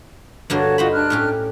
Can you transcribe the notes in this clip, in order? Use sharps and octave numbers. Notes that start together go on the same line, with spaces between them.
G2 D3 A#3 F#4 C#5 A5
D#4 F4 F#4 C5 B5
D4 F6 F#6
A2 C#4 G4